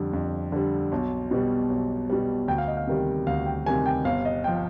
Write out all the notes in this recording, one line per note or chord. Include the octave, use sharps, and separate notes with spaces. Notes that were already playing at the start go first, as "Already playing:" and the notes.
Already playing: F2 D3 G3
F2
D3 G3
B1
B2 G3
B1
B2 G3
D2 G5
F5
D#5
F5
C3 D#3 G3
D2 F5
G5
C3 D#3 G3 G#5
G5
G1 F5
D#5
F3 G5